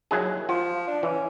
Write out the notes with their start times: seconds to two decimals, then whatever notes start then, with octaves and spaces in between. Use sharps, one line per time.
0.11 D#2 F#3 E4 G#4
0.49 F3 F4
0.88 D4
1.03 E3 C#4